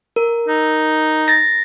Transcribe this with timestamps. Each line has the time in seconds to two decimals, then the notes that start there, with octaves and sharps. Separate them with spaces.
0.16 A#4
0.48 D#4
1.28 A6 A#6